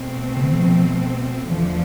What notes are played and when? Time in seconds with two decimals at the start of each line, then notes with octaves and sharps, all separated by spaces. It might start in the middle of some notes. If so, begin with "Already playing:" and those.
Already playing: B2 A3 C4
0.37 C3
0.44 D3
0.52 E3
0.58 F3
1.51 E2 D3 E3 F3 A3